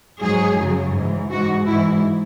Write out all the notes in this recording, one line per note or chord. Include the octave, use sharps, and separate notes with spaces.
G#2 F#3 G#4
F#2 C#3 F#3
G#2
E3
G#2 E3 F#4
G#2 E3 E4